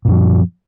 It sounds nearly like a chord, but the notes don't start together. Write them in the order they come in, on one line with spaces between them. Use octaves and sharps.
A#2 F#2 F3